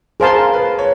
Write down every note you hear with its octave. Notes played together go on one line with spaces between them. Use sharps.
G#4 A#4 C5 F5 A5 C6
B4
C#5